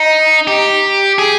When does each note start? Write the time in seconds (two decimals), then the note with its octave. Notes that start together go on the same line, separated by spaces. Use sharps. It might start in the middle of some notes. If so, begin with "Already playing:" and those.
Already playing: D#4
0.47 G4
1.19 G#4